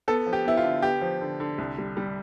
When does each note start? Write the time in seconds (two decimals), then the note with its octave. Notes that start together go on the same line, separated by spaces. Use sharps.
0.08 B3 A4
0.26 F3
0.33 G4
0.45 B3 E4
0.57 F4
0.64 D3
0.82 B3 G4
1.01 F3
1.21 D3
1.40 D3
1.58 C2
1.78 G3
1.97 G3